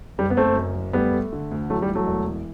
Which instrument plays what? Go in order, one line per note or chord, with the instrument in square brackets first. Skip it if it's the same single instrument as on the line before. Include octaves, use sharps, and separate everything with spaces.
[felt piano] F#1 [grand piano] G3
[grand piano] B3
[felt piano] F#1 [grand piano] A3 C4
[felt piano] F#2
F#1
[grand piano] G3 B3 [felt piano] A3
[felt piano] A3
D3
D2
[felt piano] E3 [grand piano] F#3 A3
[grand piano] G3
[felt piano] E3
[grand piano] F#3 A3
[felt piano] E1
E3